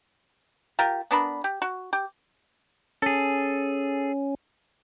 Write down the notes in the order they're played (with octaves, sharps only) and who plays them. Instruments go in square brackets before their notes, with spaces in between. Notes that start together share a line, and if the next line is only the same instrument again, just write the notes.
[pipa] F4 G4 A#4
B3 D4 A#4 B5
G4
F#4
G4
[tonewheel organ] C#4 [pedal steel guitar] G#4 A4